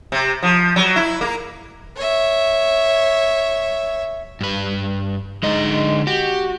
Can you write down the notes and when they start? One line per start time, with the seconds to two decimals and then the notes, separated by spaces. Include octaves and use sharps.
0.12 C3
0.43 F3
0.76 F#3
0.96 E4
1.21 A#3
1.96 C#5 E5
4.41 G2 B4
5.43 D3 G#3 D#4 D#5
6.07 F#4 G4